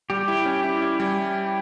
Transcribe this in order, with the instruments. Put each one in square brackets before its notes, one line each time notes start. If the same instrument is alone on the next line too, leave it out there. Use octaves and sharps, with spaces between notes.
[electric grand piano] G3 [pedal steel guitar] G4
[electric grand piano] E4
C#4
E4
E4
G3